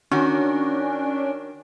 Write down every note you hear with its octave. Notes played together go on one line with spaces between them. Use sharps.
D#3 C#4 D4 F#4